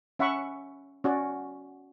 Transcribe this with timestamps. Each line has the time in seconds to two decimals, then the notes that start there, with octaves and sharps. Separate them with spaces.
0.19 C#4 E5 F#5 B5 C#6
1.04 C#4 F#4 D5